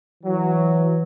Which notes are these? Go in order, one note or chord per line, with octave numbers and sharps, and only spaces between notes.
E3 F#3